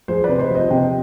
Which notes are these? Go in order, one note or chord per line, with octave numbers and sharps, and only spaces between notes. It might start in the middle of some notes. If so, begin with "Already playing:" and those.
F3 G#4 C5
B4 D5
C3
C5 D#5
F3
C5 D#5
C3 D#5 G5